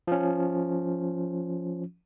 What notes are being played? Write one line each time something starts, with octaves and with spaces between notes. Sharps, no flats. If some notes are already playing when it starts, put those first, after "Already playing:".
F3 C#4